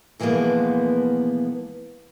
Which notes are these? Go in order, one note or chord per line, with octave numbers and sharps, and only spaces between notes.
B2 E3 F3 G#3 A#3 B3